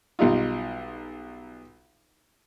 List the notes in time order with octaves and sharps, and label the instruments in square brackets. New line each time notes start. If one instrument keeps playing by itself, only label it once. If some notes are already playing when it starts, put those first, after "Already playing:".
[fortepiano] B1 G3 D#4 F4